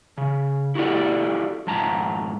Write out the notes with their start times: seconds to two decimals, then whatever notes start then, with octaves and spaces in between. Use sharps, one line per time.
0.18 C#3
0.75 E4 F#4 G4 A4 D5
1.67 F2 G#2 A5 A#5